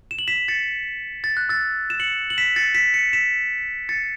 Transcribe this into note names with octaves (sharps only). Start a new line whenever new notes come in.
E7
F#7
B6 E7
A6 C#7
A6
F#6
E6 A6
E7
C#7 F#7
F#7
B6 E7
A6 C#7
B6 E7
C#7 F#7
B6 E7
A6 C#7